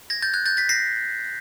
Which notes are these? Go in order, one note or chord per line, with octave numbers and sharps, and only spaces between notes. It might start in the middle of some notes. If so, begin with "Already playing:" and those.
G#6 A#6
G6 A6
F#6 G#6
G6 A6
A6 B6
A#6 C7